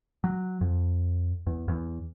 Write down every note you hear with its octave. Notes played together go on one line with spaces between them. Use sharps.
F#3
F2
E2
E2